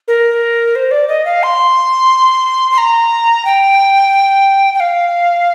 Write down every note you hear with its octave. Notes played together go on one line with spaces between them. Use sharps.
A#4
C5
D5
D#5
F5
C6
C6
A#5
G5
G5
F5